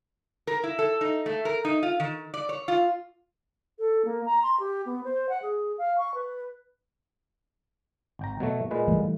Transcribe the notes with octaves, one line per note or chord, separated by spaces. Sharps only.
A#4
E4
A4
D#4
A3
A#4
D#4
F4
D#3
D5
C#5
F4
A4
A#3
A#5
C6
G4
B3
C5
F#5
G#4
F5
C#6
B4
G#1 G5 A#5
B2 F#3 A3
A#2 G#3 B4
E3 G3 A3